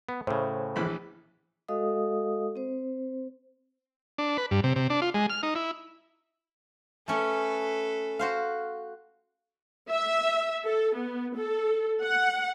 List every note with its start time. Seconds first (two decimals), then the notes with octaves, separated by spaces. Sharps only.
0.09 B3
0.27 A2 C#3 C5
0.76 A#1 E3 B5
1.68 G#3 F#4 A4 D#5 F5 D#6
2.56 C4 C5
4.18 D4
4.37 B4
4.51 G2
4.64 C3
4.76 C3
4.90 D4
5.02 F4
5.14 G#3
5.30 F6
5.43 D#4
5.55 E4
7.08 A3 C#4 A4 B4 C#5
8.19 F#4 C5 F5
9.90 E5
10.64 A4
10.96 B3
11.37 A4
12.04 F#5